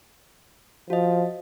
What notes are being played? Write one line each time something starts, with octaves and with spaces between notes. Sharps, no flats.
F3 F#4 D#5